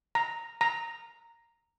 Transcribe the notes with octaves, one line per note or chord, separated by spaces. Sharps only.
A#5
A#5